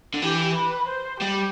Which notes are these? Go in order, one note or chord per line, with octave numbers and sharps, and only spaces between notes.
D3
E3 G4
B4
C5
G3 G4